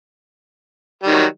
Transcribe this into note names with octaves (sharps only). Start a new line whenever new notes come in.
D#3 F#3 G3